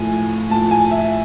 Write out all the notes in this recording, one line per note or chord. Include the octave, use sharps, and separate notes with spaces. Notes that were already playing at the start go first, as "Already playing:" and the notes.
Already playing: A2 F3 G#5
A2 F3 A5
G#5
E5